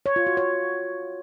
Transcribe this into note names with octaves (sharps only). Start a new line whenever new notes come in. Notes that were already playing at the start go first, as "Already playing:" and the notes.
C#5
F4
F#4
C#5